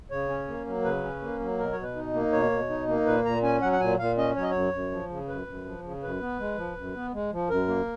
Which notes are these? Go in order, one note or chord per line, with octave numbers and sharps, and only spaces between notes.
C#3 C#5
C#4
A#3
F#3
C#3 B4
C#4
A#3
F#3
B2 A#4
B2 C#5
B4
D#4
A#3
B2 C#5
B2
D#4
A#3
A#2 B4
A#2 A#5
C#4 G#5
F#3 F#5
F#5
A#2 G#5
A#2 F5
C#4 D#5
F#3 C#5
D#5
F#2 C#5
F#2
F3
C#3
F#2 B4
F#2
F3
C#3
F#2 B4
B3
G#3
F3
F#2
B3
G#3
F3
F#2 A#4
A#3